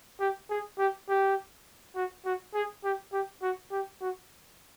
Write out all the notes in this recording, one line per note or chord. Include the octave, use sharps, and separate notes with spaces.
G4
G#4
G4
G4
F#4
F#4
G#4
G4
G4
F#4
G4
F#4